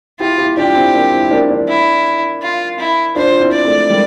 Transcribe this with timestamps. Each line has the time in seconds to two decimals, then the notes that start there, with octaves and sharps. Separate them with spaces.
0.20 E4 F4 G4
0.38 E4 G4
0.57 D4 F4 G4
0.75 C4 E4
0.94 A#3 D4
1.12 C4 E4
1.24 E4
1.30 A#3 D4
1.50 A#3 D4
1.68 E4
2.42 F4
2.79 E4
3.16 D4 F4 C5
3.32 F4
3.40 C4 E4
3.53 D5
3.65 A3 C4
3.89 G3 A#3